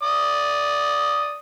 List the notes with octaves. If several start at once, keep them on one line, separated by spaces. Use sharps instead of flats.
D5 D#6